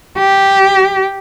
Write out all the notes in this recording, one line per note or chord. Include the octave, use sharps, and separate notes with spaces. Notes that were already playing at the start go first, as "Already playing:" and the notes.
G4